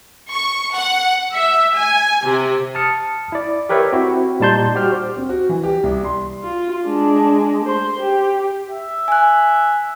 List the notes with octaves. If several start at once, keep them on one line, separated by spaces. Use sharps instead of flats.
C#6
F#5
E5
G#5
C3
A5 D#6 F6 C#7
E4 D5
G4 A#4 B4 C#5 E5
C4 E4 F#4
A#2 G3 D#4 A5 C6 G6
F#4 G4 C5 F6
C4
F#4
E3
G4
C2
C6
F4
G#3 D4
C5 C6
G4
E5
G#5 F#6